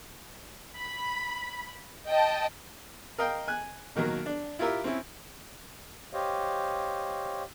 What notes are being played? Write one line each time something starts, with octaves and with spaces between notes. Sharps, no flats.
B5
D#5 G5 A5
A#4 D#5 F5 G5
G#5 F#6
B2 D#3 F#3 A#3
D4
E4 F4 G4 A#4 E5
C4 C#4 E4
G4 C5 C#5 D#5 F5